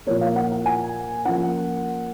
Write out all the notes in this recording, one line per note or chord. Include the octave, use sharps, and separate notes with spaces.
A#2 F3 A#3 C#5
F5
F#5
F#5
G#5
F3 A#3 C#4 F#5